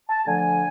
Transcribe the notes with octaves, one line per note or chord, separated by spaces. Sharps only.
A5
D3 F3 A3 G#5